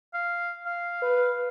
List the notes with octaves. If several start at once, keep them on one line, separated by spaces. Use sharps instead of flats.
F5
F5
B4